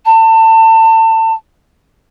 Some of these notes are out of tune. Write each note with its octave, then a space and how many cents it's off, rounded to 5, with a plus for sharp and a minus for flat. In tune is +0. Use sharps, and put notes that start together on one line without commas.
A5 +30